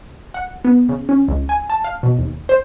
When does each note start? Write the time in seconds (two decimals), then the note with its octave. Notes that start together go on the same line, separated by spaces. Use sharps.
0.34 F#5
0.65 B3
0.89 C#3
1.09 C#4
1.28 C#2
1.49 G#5
1.70 A5
1.84 F5
2.03 B2
2.19 D#2
2.49 C5